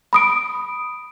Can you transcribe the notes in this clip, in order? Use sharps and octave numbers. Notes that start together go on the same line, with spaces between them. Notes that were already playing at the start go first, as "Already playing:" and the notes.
B5 D#6 D7